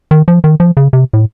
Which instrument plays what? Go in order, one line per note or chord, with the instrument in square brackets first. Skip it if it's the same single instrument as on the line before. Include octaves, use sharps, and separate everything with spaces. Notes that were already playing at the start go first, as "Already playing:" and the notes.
[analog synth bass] D#3
F3
D#3
F3
C#3
C3
A2